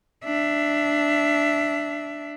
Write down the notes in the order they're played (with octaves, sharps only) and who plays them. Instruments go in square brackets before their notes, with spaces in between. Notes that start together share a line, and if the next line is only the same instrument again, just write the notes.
[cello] D4 E5